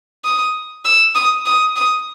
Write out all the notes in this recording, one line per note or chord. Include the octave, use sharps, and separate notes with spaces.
D#6
E6
D#6
D#6
D#6